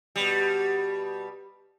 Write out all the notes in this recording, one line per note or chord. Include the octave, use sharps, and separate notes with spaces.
B2 G3